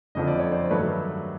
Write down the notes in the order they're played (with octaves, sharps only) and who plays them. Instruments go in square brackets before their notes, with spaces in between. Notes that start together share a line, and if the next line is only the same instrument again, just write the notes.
[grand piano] F#1 F2 D3 F3 D#5
D5
C#5
C5 D5
G2 D#3 F#3 A3 B4 C#5